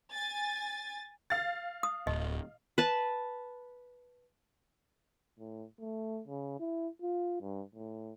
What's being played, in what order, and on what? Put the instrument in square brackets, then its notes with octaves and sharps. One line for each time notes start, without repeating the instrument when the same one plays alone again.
[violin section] G#5 A6
[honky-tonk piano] F5 A6
[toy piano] D#6
[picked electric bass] D1 [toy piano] D#5
[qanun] B4 A5
[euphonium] A2
A3
C#3
E4
F4
G2
A2